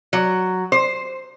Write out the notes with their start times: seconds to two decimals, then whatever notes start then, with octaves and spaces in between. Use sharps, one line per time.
0.13 F#3
0.72 C5